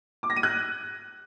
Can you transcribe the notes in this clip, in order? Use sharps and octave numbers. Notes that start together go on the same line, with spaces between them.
D6
A#6
D#7
F#6